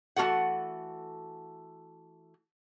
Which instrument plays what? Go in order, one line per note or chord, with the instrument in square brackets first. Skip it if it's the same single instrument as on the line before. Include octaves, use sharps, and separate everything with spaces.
[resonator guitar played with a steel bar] E3 A3 A#3 F#4 A4 F#5